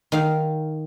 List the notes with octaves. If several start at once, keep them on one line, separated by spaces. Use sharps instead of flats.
D#3 F5